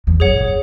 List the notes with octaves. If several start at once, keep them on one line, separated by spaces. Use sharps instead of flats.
E2
F#2 G#4 C#5 F#5
A#2